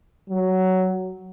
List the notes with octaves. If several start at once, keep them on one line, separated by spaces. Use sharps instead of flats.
F#3